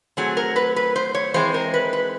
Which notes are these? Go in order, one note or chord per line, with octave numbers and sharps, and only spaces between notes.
F#3 A3 C4 G#4
A#4
B4
B4
C5
C#5
E3 G#3 C4 C5
A#4
B4
B4